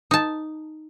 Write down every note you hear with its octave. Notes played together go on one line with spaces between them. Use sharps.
D#4 A5